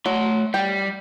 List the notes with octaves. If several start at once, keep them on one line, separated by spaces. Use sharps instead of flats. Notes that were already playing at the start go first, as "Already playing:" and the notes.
F#3 A3 C6
G3 G5